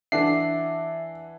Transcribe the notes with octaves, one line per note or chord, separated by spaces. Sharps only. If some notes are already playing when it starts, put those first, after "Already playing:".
E3 D4 A4 E5 F#5 C7